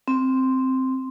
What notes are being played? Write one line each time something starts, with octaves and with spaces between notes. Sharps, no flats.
C4